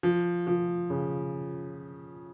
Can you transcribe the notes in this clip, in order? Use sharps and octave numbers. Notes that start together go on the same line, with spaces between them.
F3
F3
C#3